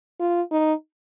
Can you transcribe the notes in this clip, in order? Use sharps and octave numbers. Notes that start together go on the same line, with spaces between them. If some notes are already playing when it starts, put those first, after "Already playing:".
F4
D#4